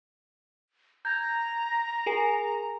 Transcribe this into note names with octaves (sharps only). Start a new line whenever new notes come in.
A#5 G6 G#6
G#4 A#4 G#5